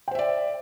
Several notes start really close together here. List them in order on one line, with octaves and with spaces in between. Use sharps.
G5 C5 E5 D5